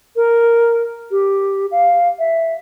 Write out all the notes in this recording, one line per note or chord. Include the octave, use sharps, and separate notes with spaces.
A#4
G4
F5
E5